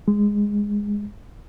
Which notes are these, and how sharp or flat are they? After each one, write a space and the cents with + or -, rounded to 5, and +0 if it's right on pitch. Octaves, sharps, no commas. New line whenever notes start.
G#3 -10